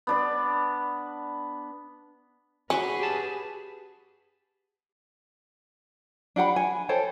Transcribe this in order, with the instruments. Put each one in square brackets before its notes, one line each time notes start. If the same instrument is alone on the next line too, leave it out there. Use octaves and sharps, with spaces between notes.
[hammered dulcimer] B3 D4 B4
[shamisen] C#4 [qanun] F#4 C#6 D6 [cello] G#4 B4
[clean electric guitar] G4 A5
[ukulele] D4 G4 F#5 B5
G#5
A4 C5 C#5 G5